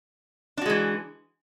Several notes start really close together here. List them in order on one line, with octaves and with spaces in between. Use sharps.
D4 F#4 G#3 E3